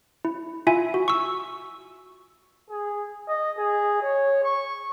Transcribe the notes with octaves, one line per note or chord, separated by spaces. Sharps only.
E4
E4 F4 E5 G#5
F#4
C#6 E6
G#4
D#5
G#4
C#5
C#6